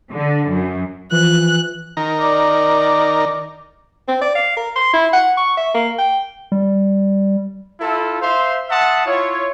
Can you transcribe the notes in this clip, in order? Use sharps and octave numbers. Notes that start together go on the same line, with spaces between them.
D3
F#2
E3 F3 F#6
D#3 A#4
D5
C4
D5
F5
A#4
C6
E4
F#5
C#6
E5
A#3
G5
G3
E4 F4 A4
C5 E5 F5 C6
E5 F#5 A5 C6 D#6
E4 F4 C#5